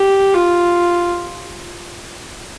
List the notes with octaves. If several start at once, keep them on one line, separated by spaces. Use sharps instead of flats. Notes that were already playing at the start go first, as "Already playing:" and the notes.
Already playing: G4
F4